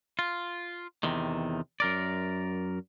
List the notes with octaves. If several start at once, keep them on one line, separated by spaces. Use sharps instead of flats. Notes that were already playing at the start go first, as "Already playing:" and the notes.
F4
E2 C3 D#3
F#2 A#4 D5